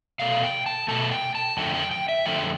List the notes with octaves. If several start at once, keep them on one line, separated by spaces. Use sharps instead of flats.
B2 A3 F5
G5
A5
B2 A3 A5
G5
A5
F2 D3 F3 A3 G5
G5
G5
E5
F2 D3 F3 A3 G5